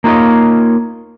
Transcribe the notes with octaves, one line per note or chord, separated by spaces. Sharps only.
A#3 D#4 F4 A#4 C#5 D#5